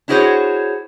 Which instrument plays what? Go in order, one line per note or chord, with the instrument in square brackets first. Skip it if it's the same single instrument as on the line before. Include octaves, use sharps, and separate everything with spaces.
[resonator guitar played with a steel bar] D4 E4 F#4 G#4 C5 C#5